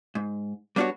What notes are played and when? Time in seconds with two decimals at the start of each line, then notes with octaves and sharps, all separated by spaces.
0.15 G#2
0.76 G3 B3 D4 F4 F#4 C#5